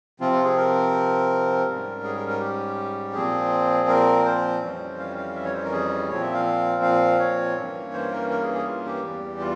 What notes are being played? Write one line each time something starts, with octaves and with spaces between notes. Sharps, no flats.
C3 F3 C4 F4
F4
G#4
A#4
G#2 G3 C#4
G#4
A#4
A#4
G4
A#2 F3 C4 G#4
A#4
C5
F2 E3 G3 C#4
F5
F5
E5
C#5
C5
A#4
G#4
A#2 F3 C4 C#5
E5
F5
F5
C#5
G2 E3 A#3 C#4
C5
A#4
A#4
G#4
G#4
F4
G4
E2 E3 G3
F4